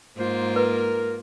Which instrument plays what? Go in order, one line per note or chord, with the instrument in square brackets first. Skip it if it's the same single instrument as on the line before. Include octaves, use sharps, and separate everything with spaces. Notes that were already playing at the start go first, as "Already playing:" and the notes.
[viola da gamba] G#2 A#3 F4 [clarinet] C5
[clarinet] A#4 [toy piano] B4